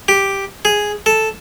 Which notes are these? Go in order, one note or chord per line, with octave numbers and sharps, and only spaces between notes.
G4
G#4
A4